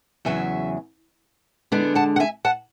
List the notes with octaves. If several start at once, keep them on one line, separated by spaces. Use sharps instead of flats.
E2 C#3 F#3 E5 G#5
D3 G#3 B3 D4
F#5 A5
F#5
E5 G#5
F#5 A5